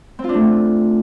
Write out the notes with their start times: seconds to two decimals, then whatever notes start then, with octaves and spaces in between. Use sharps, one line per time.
0.19 C4
0.24 F4
0.29 D4
0.34 A3